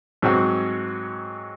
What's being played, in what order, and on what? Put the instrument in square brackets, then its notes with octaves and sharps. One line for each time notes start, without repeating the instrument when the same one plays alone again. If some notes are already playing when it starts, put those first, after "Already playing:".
[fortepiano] G#2 F#3 C4 F#4